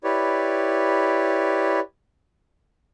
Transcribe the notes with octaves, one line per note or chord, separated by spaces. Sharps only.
E4 G4 B4 C#5 D5